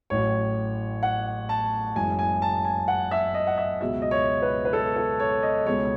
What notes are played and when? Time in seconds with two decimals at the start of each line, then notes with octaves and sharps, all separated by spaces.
0.10 A1 A2 F#3 C#5
1.03 F#5
1.49 A5
1.95 F#1 F#2 E3 G#3 G#5
2.19 G#5
2.42 A5
2.64 G#5
2.88 F#5
3.11 E5
3.34 D#5
3.47 F#5
3.57 E5
3.81 C#2 B2 F#3 E5
4.02 D#5
4.11 C#5
4.42 B4
4.65 B4
4.73 A4
4.96 A4
5.20 C#5
5.43 D#5
5.66 C#2 B2 G#3 C#5